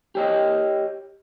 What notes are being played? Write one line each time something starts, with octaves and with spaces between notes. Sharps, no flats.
G4 C#5 D#5